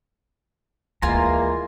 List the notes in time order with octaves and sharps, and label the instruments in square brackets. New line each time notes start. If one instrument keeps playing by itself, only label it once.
[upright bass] D2 [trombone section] E3 G#3 A#3 [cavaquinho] F4 G#5 C6 [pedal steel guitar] A#5